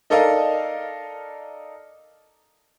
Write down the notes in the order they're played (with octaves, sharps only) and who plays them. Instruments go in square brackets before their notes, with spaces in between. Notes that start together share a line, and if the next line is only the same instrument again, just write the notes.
[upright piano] D#4 A4 A#4 D5 D#5 F5